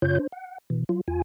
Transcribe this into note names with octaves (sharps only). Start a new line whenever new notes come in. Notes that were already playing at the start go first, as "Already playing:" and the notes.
F#2 C#3 F4 C#5 G6
D4 C5
F#5
B2 E3
F#3 F4
E2 F4 G#5